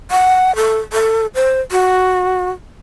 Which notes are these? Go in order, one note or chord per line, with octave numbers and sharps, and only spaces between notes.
F#5
A4
A4
C5
F#4